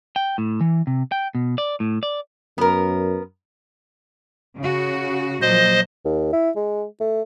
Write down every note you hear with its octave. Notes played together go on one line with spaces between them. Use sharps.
G5
A2
E3
C3
G5
B2
D5
A2
D5
F#2 B3 A#4
C#3 F#4
A#2 F3 F#3 C5 D#5
D#2
E4
G#3
A3